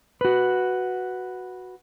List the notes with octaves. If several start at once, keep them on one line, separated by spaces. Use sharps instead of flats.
F#4 B4